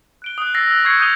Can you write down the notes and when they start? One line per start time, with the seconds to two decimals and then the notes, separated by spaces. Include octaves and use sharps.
0.22 F#6 D7 G7
0.38 D#6 F#6
0.54 E6 A6 A#6 C7
0.67 E6 F#6
0.85 C#6 E6 G6 G#6 C7 C#7
1.00 D#6 G6 G#6 D#7 F7 G7